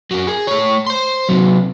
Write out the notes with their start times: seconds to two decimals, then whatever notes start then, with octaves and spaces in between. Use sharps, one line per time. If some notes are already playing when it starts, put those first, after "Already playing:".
0.11 F#3 C#4
0.27 G#4
0.47 A3 C#5
0.87 C5 C6
1.29 C3 F#3